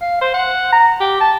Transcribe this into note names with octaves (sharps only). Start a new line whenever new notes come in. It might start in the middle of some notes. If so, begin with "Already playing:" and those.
F5
C5
F#5
A#5
G4
A5